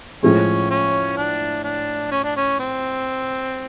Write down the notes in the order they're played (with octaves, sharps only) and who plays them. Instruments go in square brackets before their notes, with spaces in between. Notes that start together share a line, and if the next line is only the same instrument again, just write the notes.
[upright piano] A2 F3 G#3 [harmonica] C#4
[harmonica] C#4
D4
D4
C#4
D4
C#4
C4